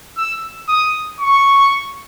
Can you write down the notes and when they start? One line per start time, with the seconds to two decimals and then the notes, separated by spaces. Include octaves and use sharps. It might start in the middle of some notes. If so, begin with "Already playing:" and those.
0.17 E6
0.68 D#6
1.20 C#6